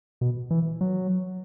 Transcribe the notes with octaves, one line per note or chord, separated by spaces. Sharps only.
B2
E3
F#3